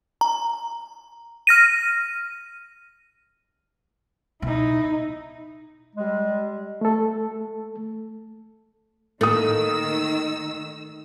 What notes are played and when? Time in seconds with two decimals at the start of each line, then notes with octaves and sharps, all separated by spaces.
0.21 A#5
1.47 F6 A#6 D#7
4.42 B2 D#4 E4
5.96 G3 G#3
6.81 A3 A4
9.21 A2 D#3 A3 A#3 D#6 E6